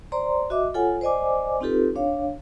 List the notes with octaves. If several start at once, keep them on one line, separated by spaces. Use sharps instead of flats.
C5 D5 A#5 C6
F#4 D#5 E5 D6
F4 A4 C#5 F#5 G#5
C5 D5 D#5 G#5 D6
C4 D#4 F4 G4 A4 B4
D4 C#5 F5